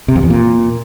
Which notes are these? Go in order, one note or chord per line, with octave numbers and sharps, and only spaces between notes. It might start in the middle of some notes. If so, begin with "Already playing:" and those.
C3
F2
E2
A#2